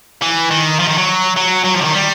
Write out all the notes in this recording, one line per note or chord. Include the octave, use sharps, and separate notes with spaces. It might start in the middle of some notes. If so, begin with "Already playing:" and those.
E3
D#3
F3
D#3
F#3
F#3
F#3
F3
D3
D#3
G3